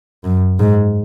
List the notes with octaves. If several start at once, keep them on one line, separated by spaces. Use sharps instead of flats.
F#2
G#2